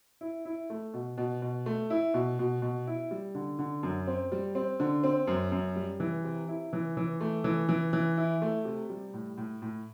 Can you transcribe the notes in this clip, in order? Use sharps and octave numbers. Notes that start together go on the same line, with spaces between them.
E4
E4
A3
B2
B2
B2
A3
E4
B2
B2
B2
E4
G3
D3
D3
F#2
C4
G3
C4
D3
C4
F#2
F#2
G3
E3
C3
E4
E3
E3
A3
E3
E3
E3
E4
A3
C3
G3
A2
A2
A2